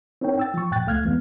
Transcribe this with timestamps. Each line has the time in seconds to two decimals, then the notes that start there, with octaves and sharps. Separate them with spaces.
0.21 C4 D4 D#4 A#4 C#5 G5
0.38 G5 E6 A6
0.54 F3 C#6
0.71 F#2 A#2 G5 F#6 A6
0.87 C#2 A3 F5 F6 F#6 G#6
1.04 F2 E3 G#3 B3